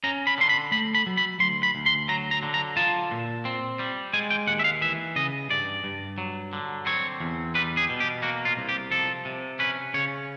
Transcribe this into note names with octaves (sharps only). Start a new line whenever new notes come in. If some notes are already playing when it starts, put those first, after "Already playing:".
C#4 A#5
B5
D3 C6
B5
A3 B5
B5
F#3
B5
D2 C6
B5
D2
C6
F#3 A#5
A#5
D3
A#5
F4 A5
A#2
C4
G3
G#3 G#5
G5
D#2 F#5
E5
F5
E3 E5
C#3 D#5
G2 D5
G2
F#3
D3
C4 C#5
E2
G3 B4
G#4
B2
G4
A#3 F#4
F4
C2
G4
F3 A4
C3
C#4 B4
C#3 C#5